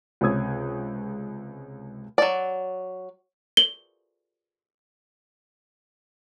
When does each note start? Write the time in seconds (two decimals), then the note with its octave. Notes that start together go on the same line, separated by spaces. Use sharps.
0.21 C#2 C3 C#5 D#6 G#6
2.18 F#3 D5
3.57 F#7 G7